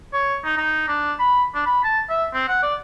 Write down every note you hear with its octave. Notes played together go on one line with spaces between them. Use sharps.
C#5
D#4
D#4
D4
B5
D4
B5
A5
E5
C4
F#5
D5